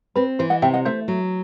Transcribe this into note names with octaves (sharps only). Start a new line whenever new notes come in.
C4 B4
E3 C5
D#5 F#5
C3 E5 G5
D#5 F#5
A3 C5 E5
F#3